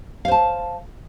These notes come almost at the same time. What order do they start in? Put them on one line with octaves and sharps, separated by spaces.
F5 C5 A5